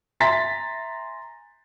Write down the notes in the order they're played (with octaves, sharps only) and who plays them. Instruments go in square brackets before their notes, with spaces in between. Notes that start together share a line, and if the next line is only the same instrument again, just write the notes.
[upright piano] E5 G#5 A#5 C6 A6 B6